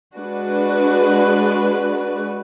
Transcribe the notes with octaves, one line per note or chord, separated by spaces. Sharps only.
G#3 D4 F#4 B4